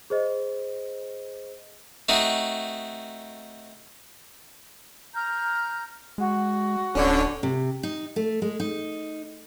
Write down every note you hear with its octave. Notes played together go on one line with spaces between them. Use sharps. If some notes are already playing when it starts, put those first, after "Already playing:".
G#4 C5 D#5
A3 C4 D#4 F#4
A#5 F6 G6
G#3 F#4
D1 D3 C#4 D4 C#5
C3
D#4
A3
G#3
D#4